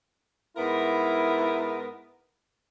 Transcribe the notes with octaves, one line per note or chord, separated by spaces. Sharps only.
G#2 B3 E4 A#4